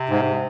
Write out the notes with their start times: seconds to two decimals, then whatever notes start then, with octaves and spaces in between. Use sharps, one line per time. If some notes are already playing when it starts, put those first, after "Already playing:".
Already playing: C3
0.09 G#2